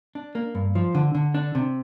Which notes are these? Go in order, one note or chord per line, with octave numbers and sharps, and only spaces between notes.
D4
A#3
G2
F3
D3
D3
D4
C3